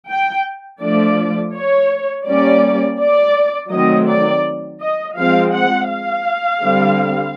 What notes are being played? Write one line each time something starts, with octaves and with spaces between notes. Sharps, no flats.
G5
F3 A3 D4 D5
C#5
G3 A#3 C#4 D5
D5
D#3 F#3 A3 C4 D#5
D5
D#5
F3 G#3 C4 F5
F#5
F5
D3 G3 C4